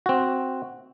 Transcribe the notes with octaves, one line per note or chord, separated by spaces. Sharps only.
C4 F#4